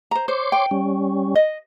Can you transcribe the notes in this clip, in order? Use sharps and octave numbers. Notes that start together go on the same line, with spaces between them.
C5 A#5
C5 C#5 C6 D6
G5
G3 C#4
D#5